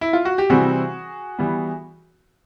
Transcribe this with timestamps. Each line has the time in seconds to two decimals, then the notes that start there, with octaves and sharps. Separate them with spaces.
0.01 E4
0.13 F4
0.25 F#4
0.38 G4
0.50 C3 E3 G3 C4 F#4 G#4
1.39 E3 G3 B3